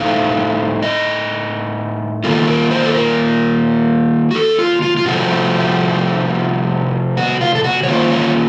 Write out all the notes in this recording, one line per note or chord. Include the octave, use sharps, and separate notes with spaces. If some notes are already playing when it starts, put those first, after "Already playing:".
Already playing: A2 A3 C4 D#4 F5
D#5
D#3 A#3 F4 A4
A#4
C5
A4
A#4
F#4
A4
F4
F4
F4
C3 F3 A3 C4 F#4
F#4
F4
A4
F#4
C#5
D#3 A#3 C#4 F4 C5
C#5